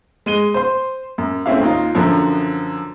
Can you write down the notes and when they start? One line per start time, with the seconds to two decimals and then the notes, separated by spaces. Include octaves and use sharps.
0.26 G#3 D#7 G7
0.54 C5 C6
1.18 F#2
1.46 A3 C4 C#4 E4 F5
1.61 D#2 D#4 F4
1.95 F#2 D3 F3 F#3